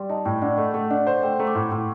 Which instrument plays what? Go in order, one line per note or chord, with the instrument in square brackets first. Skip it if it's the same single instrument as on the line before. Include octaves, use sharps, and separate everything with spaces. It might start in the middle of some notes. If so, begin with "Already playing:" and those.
Already playing: [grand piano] G3 [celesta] C6
[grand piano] D#4 [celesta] A5
[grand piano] A2 [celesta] G5
[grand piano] D4 [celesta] F#5
[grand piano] A3 [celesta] D#5
[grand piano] A3 [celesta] F#5
[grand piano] D4 [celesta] F#5
[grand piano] C5
[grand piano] A3 [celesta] G5
[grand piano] A3 [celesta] A#5
[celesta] D6
[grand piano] A2 [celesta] C6
[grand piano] A2 [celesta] C6